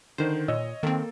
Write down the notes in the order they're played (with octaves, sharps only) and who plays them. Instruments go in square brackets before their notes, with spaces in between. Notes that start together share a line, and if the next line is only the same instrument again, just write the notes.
[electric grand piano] D3 D#3 [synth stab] C5
[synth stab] A#2 [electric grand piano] C#5 D#5 E6
[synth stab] D#3 C4 [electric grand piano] A#3 A4